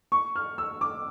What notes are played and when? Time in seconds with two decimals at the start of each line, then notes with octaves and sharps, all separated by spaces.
0.12 C#6
0.36 F6
0.58 E6
0.81 D6